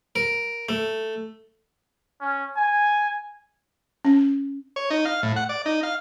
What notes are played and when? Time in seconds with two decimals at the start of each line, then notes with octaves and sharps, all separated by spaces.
0.16 A#4
0.69 A3
2.21 C#4
2.56 G#5
4.05 C#4
4.76 C#5
4.90 D#4
5.05 F5
5.23 A2
5.36 F#5
5.49 D5
5.66 D#4
5.83 F5